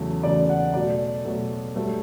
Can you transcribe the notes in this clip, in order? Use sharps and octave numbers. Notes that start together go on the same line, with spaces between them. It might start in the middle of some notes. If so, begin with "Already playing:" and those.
Already playing: E2 C#3 F#3 A3
E2 C#3 F#3 A3 D5
F#5
B2 F#3 A3 D5
B2 F#3 A3
G2 F#3 A3